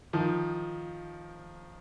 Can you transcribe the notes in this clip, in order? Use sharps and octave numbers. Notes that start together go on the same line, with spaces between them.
D#3 F3